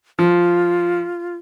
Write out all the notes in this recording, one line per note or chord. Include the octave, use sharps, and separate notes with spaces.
F3 F4